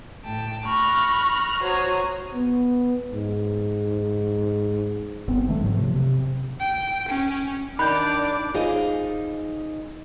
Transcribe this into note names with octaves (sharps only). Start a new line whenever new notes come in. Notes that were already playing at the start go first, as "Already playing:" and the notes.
A2 G5 A5
B5 C#6 F6 F#6 A#6
F#4 C5 C#5 A#5 D#6
B3
G#2
G1 B3 C4
D3 E3 G3 A3
G#2 F#3
C3 F3
C3
G5
C#4
D#3 D4 D5 B5 D6 F#6 G6
D#4 F4 G#4 C5 D#5